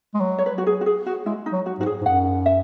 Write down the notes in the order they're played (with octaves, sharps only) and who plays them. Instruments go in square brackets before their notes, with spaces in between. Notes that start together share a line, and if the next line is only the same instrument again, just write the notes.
[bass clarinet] G#3
F#3
[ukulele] C#5
B4
F#4
G#4
F#4
G#4
F#4
[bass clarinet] G#3 [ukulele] E4
[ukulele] D#4
[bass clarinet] F#3
[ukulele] F#4
[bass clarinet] G#2 [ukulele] F#4
[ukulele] G#4
[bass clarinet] G#2
[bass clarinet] F#2 [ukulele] F#5
[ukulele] E5